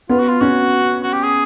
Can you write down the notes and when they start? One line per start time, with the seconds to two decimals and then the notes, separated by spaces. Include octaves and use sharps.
0.09 B3 F4
0.19 F#4
0.29 F4
0.41 C#4 F#4
1.03 F#4
1.13 G4
1.23 G#4